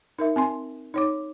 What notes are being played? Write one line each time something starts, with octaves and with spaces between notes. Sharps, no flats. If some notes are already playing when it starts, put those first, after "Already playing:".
D#4 A#4 E5
C4 G#5 C6
D#4 C#5 D6